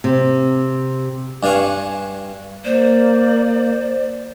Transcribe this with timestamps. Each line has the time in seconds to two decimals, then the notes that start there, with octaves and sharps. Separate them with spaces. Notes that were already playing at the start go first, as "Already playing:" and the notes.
0.04 C3
1.43 G2 D4 F5 G#5 C#6
2.64 A#3 C5 D5